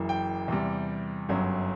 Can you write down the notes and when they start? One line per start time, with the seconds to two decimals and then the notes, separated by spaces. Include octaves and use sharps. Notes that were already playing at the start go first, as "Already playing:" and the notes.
Already playing: F#1 F#2 E3
0.09 G5
0.48 E2 C3 G3
1.29 G1 F#2 F#3